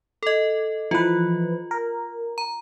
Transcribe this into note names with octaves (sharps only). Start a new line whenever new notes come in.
A4 D#5
E3 F3 F4 B4
A#4
A#5